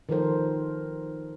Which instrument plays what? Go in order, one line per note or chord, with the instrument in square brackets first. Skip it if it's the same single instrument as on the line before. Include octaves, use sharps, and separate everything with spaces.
[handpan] D#3 F3 A4 A#4 C5